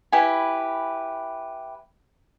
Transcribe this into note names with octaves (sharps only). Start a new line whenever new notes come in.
E4 G4 B4 G#5